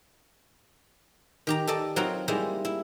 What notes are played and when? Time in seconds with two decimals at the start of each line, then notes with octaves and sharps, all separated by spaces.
1.47 D#3 G4 A#5
1.67 A4 D5 D#5 A5
1.96 F#3 C4 D#4 F4 F#4 A#4
2.28 G3 G#3 A#3 D#4 E4
2.65 E4